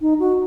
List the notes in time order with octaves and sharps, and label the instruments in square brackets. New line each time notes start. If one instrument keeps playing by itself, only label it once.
[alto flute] D#4
F#4